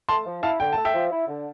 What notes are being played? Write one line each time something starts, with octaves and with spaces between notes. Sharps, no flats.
A3 A5 C6
F3
E4 F5 A5
D3 G5
A3 A5
E5 G5
F3
E4
D3